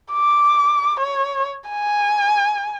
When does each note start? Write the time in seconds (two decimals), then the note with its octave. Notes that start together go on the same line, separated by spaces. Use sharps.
0.13 D6
1.00 C#5
1.69 G#5